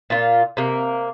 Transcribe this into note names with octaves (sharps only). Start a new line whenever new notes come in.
A#2 F4
C3 A#3